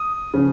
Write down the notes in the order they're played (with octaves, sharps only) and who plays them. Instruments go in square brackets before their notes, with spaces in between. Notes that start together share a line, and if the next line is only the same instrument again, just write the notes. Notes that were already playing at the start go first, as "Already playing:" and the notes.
Already playing: [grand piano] D#6
C#3 F3